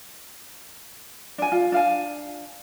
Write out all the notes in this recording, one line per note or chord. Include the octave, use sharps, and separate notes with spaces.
D4 G#5
F4
D4 F5 G#5